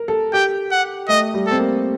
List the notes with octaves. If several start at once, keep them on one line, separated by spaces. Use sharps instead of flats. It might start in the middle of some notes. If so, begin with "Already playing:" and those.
Already playing: A#4
A4
G4 G5
F#5
A3 D#5
G3
C4 A4
A#3